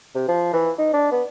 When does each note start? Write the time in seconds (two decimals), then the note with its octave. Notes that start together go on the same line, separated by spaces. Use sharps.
0.15 C3
0.28 F3
0.53 E3
0.78 D#4
0.93 D4
1.12 B3